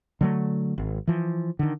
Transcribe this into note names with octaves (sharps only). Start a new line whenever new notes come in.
D3 F#3 A3
G#1
E3 F3
D3 D#3